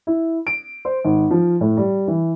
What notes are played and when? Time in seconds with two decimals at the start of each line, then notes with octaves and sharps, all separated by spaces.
0.07 E4
0.47 D7
0.85 C5
1.04 G#1
1.31 F3
1.61 A2
1.77 G3
2.08 E3